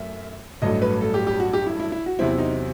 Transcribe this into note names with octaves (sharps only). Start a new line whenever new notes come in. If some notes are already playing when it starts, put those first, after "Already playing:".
Already playing: F#2 F#3 A3 E5
A1 G2 F#3 A3 D#5
B4
A4
G4
G4
F#4
G4
E4
E4
E4
F#4
E2 C3 F#3 C4 E4
D#4